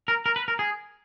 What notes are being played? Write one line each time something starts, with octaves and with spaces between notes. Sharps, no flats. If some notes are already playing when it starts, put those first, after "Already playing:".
A#4
A#4
B4
A#4
G#4